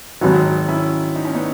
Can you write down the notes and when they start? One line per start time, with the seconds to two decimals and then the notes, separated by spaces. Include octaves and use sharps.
0.21 G#1 G#2 F#3 D#4 F#4
0.68 C#4 E4
1.16 D#4
1.25 C#4
1.35 B3 D#4